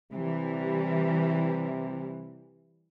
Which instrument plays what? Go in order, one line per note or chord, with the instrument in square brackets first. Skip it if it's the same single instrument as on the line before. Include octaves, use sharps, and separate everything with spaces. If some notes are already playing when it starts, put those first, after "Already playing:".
[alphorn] C3 [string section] E3 G3